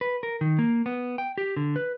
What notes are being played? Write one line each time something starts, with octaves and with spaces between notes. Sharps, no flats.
B4
A#4
D#3
A#3
B3
G5
G4
D3
B4